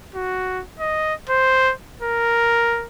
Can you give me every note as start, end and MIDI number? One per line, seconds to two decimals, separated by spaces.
0.15 0.62 66
0.79 1.14 75
1.29 1.73 72
2.02 2.87 70